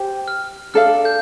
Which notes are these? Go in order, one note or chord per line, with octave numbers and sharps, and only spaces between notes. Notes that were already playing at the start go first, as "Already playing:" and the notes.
Already playing: G4 C5 G5
F6
D4 A4 D5 F5 F6
G6